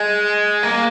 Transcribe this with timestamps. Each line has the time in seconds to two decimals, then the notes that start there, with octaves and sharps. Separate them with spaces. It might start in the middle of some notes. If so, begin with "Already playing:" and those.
Already playing: G#3
0.63 A#3